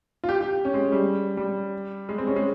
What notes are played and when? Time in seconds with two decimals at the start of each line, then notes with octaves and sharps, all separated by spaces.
0.24 F4
0.29 G4
0.41 G4
0.65 C#4
0.74 G#3
0.92 G3
1.37 G3
2.09 G#3
2.18 C4
2.27 C#4
2.36 G#3